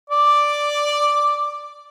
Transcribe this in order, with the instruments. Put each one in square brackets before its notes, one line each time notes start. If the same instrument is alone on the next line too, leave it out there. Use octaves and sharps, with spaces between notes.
[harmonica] D5 D6